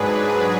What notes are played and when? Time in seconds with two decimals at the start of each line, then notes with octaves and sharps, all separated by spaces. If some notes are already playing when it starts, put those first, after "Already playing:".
Already playing: G#2 F#3 D4 G#4 B4